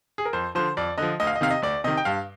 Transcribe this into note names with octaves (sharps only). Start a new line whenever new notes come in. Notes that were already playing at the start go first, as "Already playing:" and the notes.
G#4
A#4
F2 C5
D3 F3 C5
F2 D5
D3 F3 D#5
D2 D#5
F5
D#5
C3 D#3 F5
D#5
D2 D5
C3 D#3 D#5
G5
G2 F5